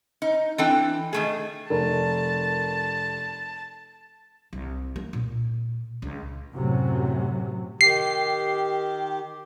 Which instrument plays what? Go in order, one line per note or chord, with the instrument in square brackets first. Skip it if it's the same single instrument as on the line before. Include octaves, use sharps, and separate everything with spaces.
[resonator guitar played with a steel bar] D#4
E3 C4 D4 A4 G5
D#3 A3 G#4
[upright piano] F1 A#4 [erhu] A5
[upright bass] C2
A#3
A#2
C#2
[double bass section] F#2 A2 C3 F#3
[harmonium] D#3 G4 [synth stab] C7